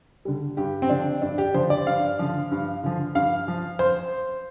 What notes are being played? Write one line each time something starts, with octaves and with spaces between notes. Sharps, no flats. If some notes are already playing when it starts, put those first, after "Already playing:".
D3 G3
G2 G4
C4
D3 F3 D4
G2 D4
G4
D3 F3 C5
D5
G2 F5
D3 F3
G2
D3 F3
G2 F5
F3
C5